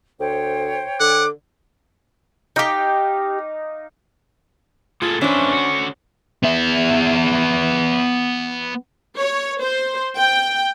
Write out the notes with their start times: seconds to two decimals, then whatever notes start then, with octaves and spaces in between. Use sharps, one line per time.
0.20 D2 C5 C#5 G5
1.00 D3 F#5 D6
2.56 D#4 G4 F5 G5 D6
5.02 A2 F4 G#4 A4
5.21 F2 C#4 D4 B4 C5 E5
5.52 D3 F#4
6.43 B3 E5
9.18 C#5
9.62 C5
10.17 G5